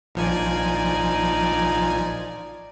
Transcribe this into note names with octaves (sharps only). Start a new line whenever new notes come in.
A#1 F3 D#4 D5 G#5